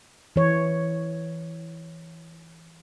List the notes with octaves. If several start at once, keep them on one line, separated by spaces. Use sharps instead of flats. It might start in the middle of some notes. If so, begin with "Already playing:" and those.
E3 C#5